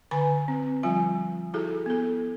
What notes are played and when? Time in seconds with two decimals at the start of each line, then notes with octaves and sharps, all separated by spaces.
0.11 D3 B4 G#5 B5
0.48 C4
0.83 F3 G3 F4 G#5
1.54 E4 F#4 G#4 A4
1.86 B3 A4